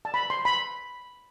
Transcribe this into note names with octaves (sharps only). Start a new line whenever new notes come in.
A5
B5
C6
B5